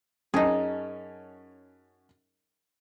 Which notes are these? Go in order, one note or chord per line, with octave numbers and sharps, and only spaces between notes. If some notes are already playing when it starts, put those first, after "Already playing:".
F#2 C#4 D#4 G#4 A5